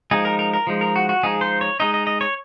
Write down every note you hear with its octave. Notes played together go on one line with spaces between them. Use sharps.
F3 G#3 D#4 G#4
A#4
A#4
A#4
F3 G#3 D#4
A#4
F#4
F#4
F3 G#3 D#4 G#4
C5
C#5
G#3 D#4 D#5
D#5
D#5
C#5